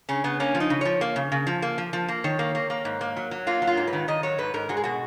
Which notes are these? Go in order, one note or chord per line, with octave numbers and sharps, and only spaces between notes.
C#3 C#4
C#3 B3
A#3 C#4
F3
D#4
C#3
F3 C#5
A#3
C#3
C#3
F3
A#3
F3
F3
A#3
D#3 C#5
A#3
A#3
A#3
G#2
A#3
F#3
F#3
A#3 F4
F#3
F4
G#2
B4
D#3
D#3 D#5
F#3 C#5
G#2 B4
G#2 A#4
G#3 F#4
G#4
B2 F#4